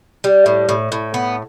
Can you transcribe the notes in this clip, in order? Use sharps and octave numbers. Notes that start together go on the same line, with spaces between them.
G3
A2
A2
A2
B3